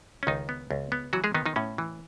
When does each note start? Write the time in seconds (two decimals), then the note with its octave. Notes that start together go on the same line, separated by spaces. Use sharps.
0.23 C#4
0.27 C#2 D#3 D#4
0.49 B3
0.71 C#2
0.92 B3
1.13 E3 F#3 F#4
1.24 G#3 G#4
1.34 D#3 B3 D#4
1.46 D#3 D#4
1.56 A2 C#4
1.78 E3